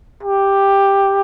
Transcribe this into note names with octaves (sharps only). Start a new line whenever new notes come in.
G4